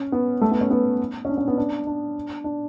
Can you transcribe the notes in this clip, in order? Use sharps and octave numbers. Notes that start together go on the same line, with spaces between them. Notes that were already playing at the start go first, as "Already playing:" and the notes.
Already playing: C#4
B3
A3
B3
C#4
B3
C#4
D4
C#4
B3
D4
D4
D4